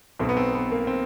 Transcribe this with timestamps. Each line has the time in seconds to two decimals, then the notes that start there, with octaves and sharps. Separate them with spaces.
0.19 B1 B2 C4
0.29 B3
0.37 C4
0.54 B3
0.71 A#3
0.87 C4